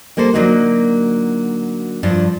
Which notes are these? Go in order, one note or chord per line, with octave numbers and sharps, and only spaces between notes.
G3 A#3 A4 C5
D3 F#3 A#3 D#4 F#4
G2 F3 D4